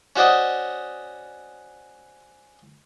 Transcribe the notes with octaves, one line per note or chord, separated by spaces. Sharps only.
C#4 F#4 C5 D5 D#5 F#5